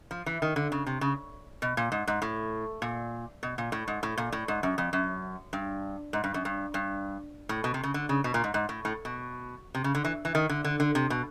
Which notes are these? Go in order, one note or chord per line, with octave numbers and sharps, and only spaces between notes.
F3
E3
D#3
D3
C#3
C3
C#3
B2
A#2
G#2
G#2
A2
A#2
B2
A#2
A2
G#2
A2
A#2
A2
G#2
F#2
F2
F#2
G2
G#2
G2
F#2
G2
G2
A2
B2
C3
C#3
D3
C#3
B2
A#2
G#2
G#2
A2
A2
B2
C3
C#3
D3
E3
E3
D#3
D3
D3
D3
C3
B2